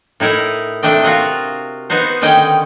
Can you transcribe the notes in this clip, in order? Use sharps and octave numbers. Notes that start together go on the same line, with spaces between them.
A2 D#4 E4 A#4
C3 A3 D4 D#5 G5
F4 F#4 A#4 D#5
B3 D#4 F#4 C5
D3 D#3 C#4 D#5 G5